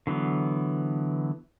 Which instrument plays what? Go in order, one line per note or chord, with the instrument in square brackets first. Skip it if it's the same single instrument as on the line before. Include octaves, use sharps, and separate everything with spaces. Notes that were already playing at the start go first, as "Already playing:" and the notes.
[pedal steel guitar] D3 E3 F#3 B3